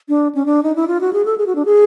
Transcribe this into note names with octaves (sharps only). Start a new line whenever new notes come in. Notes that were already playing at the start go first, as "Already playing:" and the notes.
D4
C#4
D4
D#4
E4
F4
F#4
G#4
A4
G#4
F#4
D4
G#4